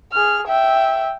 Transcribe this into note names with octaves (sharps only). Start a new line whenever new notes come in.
G#4 F6
E5 G5